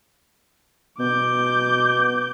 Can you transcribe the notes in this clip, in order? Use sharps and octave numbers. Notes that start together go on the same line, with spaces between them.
B2 D6 G6